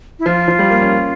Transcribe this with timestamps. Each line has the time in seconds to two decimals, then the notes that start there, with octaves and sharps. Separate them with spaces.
0.19 E4
0.26 F3 F4
0.48 F3
0.59 G3
0.70 A#3
0.82 C#4